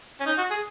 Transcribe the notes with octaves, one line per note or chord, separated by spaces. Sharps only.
C#4
D#4
F#4
G#4